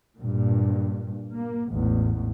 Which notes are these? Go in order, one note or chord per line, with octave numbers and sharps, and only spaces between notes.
G2 A#2
A#3
A1 E2 G#2